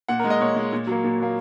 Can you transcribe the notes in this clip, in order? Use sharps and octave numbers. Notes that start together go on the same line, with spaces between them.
A#2 F#5
G#3 A#4
D#5
A#2 C#5
G#3
A#2
F#3 A#3
A#2
F#3 A#3